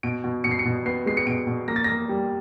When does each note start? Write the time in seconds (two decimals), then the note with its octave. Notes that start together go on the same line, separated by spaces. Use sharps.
0.03 B2 D7
0.24 B2
0.44 B2 C#7
0.51 C7
0.59 C#7
0.65 B2
0.86 B3 C7
1.06 G#3 C7
1.17 C#7
1.27 B2 D7
1.47 B2
1.68 A#3 A#6
1.76 A6
1.84 A#3 A#6
2.09 G3